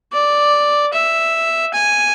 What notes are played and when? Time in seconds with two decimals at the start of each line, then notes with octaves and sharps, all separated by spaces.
0.13 D5
0.92 E5
1.74 G#5